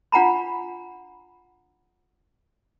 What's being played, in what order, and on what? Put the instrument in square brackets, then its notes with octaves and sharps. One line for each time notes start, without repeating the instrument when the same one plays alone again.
[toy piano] D4 F4 F#5 G#5 A#5 B5